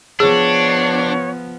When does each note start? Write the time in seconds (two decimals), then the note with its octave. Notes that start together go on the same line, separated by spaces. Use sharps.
0.20 F3 B3 D4 G#4 C#5